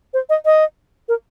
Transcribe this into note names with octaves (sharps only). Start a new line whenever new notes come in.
C5
D#5
D#5
A#4